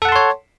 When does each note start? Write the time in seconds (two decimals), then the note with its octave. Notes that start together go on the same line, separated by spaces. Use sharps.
0.02 A4
0.05 F#5
0.09 A5
0.12 C6
0.16 C#5